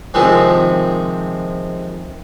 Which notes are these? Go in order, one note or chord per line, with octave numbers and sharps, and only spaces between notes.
C3 D#3 F3 G#3 C4